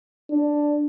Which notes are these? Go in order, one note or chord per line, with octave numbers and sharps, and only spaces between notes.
D4